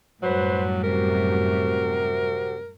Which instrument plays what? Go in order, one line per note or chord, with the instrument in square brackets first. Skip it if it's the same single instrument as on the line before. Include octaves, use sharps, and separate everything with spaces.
[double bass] F#2 [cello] A2 G3 [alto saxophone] F#3 [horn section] B4 C5
[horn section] C3 F#4 [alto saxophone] A#4